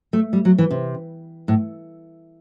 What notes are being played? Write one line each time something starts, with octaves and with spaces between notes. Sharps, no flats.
A3
G3
F#3
E3
C3
A2